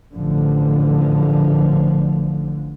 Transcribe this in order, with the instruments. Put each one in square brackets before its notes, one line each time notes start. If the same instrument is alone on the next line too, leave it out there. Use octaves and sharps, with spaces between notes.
[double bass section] A1 D3 F3